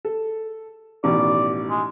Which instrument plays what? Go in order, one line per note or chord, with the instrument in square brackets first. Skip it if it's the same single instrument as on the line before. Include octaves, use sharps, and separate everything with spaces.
[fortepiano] A4
[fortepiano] A1 B2 D#3 [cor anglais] D5
[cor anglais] G#3